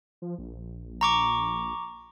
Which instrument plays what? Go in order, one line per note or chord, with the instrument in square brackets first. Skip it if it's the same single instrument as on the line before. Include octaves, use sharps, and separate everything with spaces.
[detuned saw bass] F3
A#1
[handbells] A#5 C#6 D6